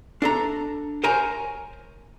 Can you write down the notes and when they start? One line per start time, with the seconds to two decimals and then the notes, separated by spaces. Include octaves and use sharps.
0.22 D4 A4 A#5
1.04 A#4 C5 C#5 G#5 A#5